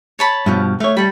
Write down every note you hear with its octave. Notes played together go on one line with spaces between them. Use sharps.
C#5 A5 B5
G2 B2 F3
A3 C#5 F5
G3 A4 B5